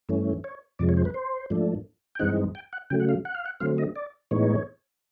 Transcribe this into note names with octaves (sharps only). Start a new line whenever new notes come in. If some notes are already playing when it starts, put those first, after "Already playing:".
G2 E3 A3 C#4
C#5
F2 C3 F3 G#3 D5
C#5
C5
B4
C5
G#2 F3 A3 D4
G5
G2 E3 G#3 C4 D#4 F#5
G5
F#5
C#3 F#3 A3 G5
F#5
F5
F#5
F5
F#5
D3 F#3 A3 C4 F5
D#5
D5
A2 E3 G#3 B3 D#4 C#5